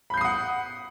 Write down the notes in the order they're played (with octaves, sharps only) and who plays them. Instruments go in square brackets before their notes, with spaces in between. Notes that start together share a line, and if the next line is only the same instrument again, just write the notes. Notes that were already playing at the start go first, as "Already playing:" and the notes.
[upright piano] B5
G6
C7
D#6
F#5